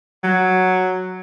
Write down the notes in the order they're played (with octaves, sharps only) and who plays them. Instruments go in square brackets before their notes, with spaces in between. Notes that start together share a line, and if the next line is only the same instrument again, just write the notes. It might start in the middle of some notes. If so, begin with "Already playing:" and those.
[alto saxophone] F#3